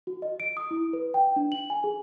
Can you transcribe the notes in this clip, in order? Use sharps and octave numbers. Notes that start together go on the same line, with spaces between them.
F#4
D#5
D7
D#6
E4
B4
G5
D4
F#7
G#5
G#4